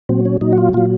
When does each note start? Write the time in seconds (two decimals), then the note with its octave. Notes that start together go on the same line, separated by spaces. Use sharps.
0.09 A#2 F#3 C4
0.25 C#4
0.41 A#2 F#3 D#4
0.53 F#4
0.58 F4
0.73 A#2 F#3 F4